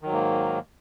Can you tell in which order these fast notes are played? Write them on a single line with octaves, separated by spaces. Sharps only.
D#3 F#3 G#2 A#3